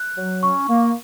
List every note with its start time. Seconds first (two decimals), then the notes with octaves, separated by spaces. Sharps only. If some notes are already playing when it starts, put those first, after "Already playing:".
Already playing: F#6
0.17 F#3
0.43 C#4 C#6
0.68 A#3